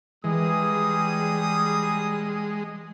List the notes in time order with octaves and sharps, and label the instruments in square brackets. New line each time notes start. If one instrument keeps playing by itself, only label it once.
[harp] E3 [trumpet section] G3 G#4 D#6 [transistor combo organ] G#3